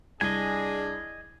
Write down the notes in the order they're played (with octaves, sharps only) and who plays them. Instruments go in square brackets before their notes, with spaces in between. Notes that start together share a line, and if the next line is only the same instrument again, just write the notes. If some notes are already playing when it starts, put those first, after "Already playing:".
[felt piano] C2 [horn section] D4 G#4 [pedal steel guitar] D#5 G#5